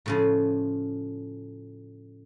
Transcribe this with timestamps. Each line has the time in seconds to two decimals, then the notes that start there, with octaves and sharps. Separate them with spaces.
0.06 A2 C#3 F3